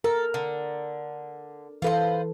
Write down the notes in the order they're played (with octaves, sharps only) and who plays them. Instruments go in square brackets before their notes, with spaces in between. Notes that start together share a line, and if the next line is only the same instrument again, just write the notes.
[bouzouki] A4 [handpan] A#4
[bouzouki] D3
[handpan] E3 A4 [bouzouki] F4 B4 C5